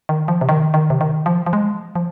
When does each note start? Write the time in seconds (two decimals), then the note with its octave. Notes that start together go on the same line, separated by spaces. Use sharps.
0.09 D#3
0.28 F3
0.41 C3
0.49 D#3
0.74 D#3
0.90 C3
1.01 D#3
1.26 F3
1.46 F3
1.53 G#3
1.96 F3